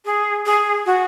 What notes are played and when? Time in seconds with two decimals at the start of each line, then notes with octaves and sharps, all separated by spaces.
0.05 G#4
0.46 G#4
0.86 F#4